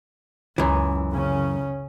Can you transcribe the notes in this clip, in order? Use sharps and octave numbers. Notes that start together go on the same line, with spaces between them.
C#2 F#2 E3
C#3 C#4